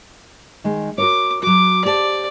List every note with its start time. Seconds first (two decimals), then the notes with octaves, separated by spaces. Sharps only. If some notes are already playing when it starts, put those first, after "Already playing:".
0.64 D#3 G#3
0.98 F#4 A#4 C#5 D6
1.43 F#3 F#4 D6
1.85 G4 C5 D5 A5